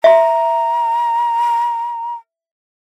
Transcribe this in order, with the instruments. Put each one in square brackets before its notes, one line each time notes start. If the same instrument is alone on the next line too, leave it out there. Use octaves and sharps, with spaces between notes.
[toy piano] E5 C6 [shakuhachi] A#5